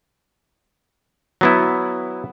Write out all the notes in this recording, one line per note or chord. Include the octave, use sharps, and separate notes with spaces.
F#3 B3 E4